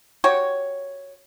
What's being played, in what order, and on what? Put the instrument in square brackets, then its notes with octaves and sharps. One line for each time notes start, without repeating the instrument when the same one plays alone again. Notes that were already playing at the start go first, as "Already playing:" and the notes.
[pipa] F#4 G4 C#5